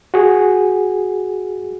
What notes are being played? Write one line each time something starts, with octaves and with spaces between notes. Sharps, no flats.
F#4 G#4